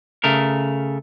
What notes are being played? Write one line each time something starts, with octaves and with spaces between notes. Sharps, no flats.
C#3 A3 A#4